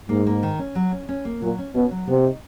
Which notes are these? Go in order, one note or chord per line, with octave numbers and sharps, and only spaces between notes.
G#2 A#3
A#3
D#3
C#4
F#3
C#4
C#4
A#3
A#2 F#3
C#4
B2 C#4
F#3
C3 B3
D#4